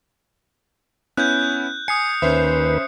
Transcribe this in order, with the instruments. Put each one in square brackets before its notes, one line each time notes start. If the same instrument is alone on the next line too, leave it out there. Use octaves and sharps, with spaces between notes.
[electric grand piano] B3 C#4 E4 [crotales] F#6 G6
[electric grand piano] G#5 [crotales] D#6 C7 C#7
[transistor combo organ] D#2 B4 [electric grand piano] C#4 C5 E5